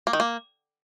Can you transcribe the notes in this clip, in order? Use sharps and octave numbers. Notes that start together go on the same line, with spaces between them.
A#3
D#3
A#3